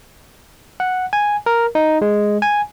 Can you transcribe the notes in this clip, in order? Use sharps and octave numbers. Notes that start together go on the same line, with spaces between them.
F#5
G#5
A#4
D#4
G#3
G#5